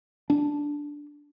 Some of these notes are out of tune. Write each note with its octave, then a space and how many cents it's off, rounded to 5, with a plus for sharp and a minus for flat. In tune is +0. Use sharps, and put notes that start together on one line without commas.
D4 -5